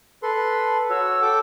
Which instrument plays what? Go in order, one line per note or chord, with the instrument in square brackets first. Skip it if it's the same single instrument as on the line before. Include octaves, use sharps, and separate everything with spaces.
[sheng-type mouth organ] A4 B4 C6
[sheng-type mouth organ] F#4 C#5 [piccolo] E6
[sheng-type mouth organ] A4 G5 D6